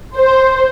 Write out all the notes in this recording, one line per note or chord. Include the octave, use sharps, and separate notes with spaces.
C5